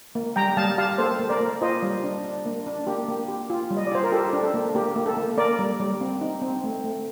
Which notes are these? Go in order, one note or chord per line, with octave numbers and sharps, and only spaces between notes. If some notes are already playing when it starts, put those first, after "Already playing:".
A#3
G3 G5 A#5
G3 F5 A5
G4 F5 A5
A#3 A4 C5
A#3
A#4 D5
A#3
F4 C5 D#5
G3
D4
D4
A#3
D4
A#3 G4
A#3
G4
F4
G3
D#5
D5
F4 C5
A#4
G4 A4
D4
A4
A#3
A#3 G4
A#3
A4
A#3
A#3 A#4 D5
G3
G3
C4
D#4
C4
A3
A3